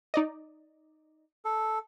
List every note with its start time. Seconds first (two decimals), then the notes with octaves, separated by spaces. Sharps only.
0.14 D#4 D5 D#5
1.45 A4